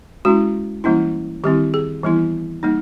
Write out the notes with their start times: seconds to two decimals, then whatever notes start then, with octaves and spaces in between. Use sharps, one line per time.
0.25 G#3 C#4 E4 F#4
0.84 E3 G3 A#3 C#4 E4
1.44 D#3 G3 C4 E4 G4
1.74 G#4
2.03 E3 G3 B3 E4
2.63 G3 A#3 D#4